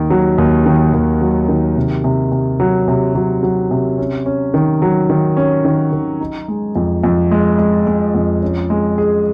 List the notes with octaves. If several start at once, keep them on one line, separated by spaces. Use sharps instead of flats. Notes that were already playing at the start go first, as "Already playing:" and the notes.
Already playing: D#2 D#3
F#3
D#2
D#3
D#2
F#3
D#3
C3
C3
C3
F#3
C3
F#3
F#3
C3
C#4
C#4
D#3
F#3
D#3
C#4
D#3
D#3
D#4
G#3
F2
F2
G#3
G#3
G#3
F2
C#4
G#3
G#4